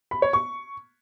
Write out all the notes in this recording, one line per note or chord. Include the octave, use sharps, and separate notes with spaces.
B5
C#5
C#6